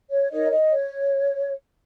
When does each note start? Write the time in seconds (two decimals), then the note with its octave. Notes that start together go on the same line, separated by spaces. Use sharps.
0.11 C#5
0.31 D#4 A#4 C#5 D#5
0.51 D#5
0.71 C#5